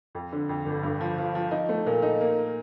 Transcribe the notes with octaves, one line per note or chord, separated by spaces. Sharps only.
F2
D3
F2
G1
G2
F3
F3
F3
D#4
A3
A#2
D#4
A#3